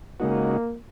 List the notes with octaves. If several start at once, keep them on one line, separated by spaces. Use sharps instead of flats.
C#3 G#3 A#3 D#4 F#4